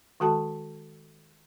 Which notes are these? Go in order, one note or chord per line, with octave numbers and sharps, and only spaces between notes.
D#3 G#3 F#4 A4 G5 A5